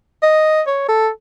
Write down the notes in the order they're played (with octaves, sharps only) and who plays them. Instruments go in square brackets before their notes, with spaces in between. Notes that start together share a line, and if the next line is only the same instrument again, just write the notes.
[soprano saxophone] D#5
C#5
A4